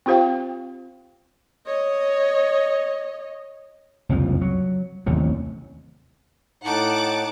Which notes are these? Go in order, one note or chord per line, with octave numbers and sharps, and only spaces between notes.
C4 F4 G4 C5 F5 G5
C#5 D#5
F#1 C2 F2 F3
F#3
A1 D#2 C3 F#3
A2 D#4 F#5 A5 D6